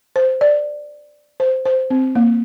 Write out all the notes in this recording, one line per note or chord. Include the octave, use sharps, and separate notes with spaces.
C5
D5
C5
C5
C4
A#3